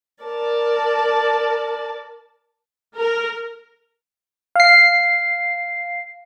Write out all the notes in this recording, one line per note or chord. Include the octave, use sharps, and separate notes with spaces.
A#4 D5 A5
A#4
F5 C7